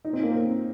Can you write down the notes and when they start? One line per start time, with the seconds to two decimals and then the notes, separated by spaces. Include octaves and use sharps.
0.05 D#4
0.13 C4
0.23 A#3
0.32 C4